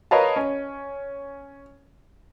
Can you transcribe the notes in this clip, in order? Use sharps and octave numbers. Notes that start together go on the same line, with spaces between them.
A#4 B4 C#5 D#5 F5 A5
C#4